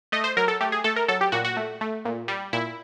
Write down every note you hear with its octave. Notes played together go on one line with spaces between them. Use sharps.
A3 D#5
C5
F#3 A#4
A4
A3 G4
G#4
A3 A4
A#4
F#3 A4
G4
A#2 F#4
F#4
A3
A3
A#2
G3
A#2 E4